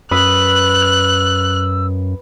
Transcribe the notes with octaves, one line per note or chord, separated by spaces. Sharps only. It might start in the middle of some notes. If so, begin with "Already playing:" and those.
F#2 B4 D#6 E6 F#6